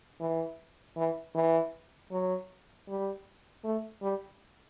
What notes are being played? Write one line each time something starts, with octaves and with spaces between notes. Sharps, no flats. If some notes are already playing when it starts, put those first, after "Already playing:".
E3
E3
E3
F#3
G3
A3
G3